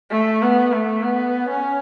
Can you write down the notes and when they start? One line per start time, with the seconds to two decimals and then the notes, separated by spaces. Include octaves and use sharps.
0.11 A3
0.42 B3
0.73 A3
1.03 B3
1.49 C#4